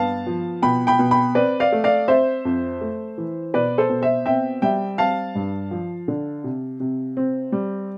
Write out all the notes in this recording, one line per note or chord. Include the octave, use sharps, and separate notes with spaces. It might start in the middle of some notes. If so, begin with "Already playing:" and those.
Already playing: G2 B3 F5 A5
F3
B2 G5 B5
G5 B5
B2
G5 B5
C4 B4 D5
D5 F5
A3
D5 F5
C4 C5 E5
F2
A3
E3
B2 B4 D5
A4 C5
B2
C5 E5
C4 E5 G5
G3 E5 G5
C4 F5 A5
G2
F3
D3
C3
C3
C4
G3